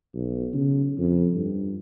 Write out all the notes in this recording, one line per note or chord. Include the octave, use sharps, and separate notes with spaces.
B1
C#3
F2
G2